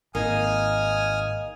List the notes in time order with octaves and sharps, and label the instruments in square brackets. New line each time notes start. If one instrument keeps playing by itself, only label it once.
[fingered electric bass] G#1 [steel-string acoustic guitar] A#3 D#4 G#4 [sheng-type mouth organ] G#5 D#6 F6